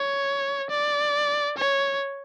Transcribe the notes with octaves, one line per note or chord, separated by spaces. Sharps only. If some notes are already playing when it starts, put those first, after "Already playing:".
Already playing: C#5
D5
C#5